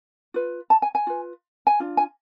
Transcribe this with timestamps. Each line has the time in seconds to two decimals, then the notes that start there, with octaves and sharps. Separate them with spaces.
0.34 F4 B4
0.70 A5
0.82 G#5
0.95 G#5
1.07 F4 B4
1.67 G#5
1.80 D4 F4
1.97 G#5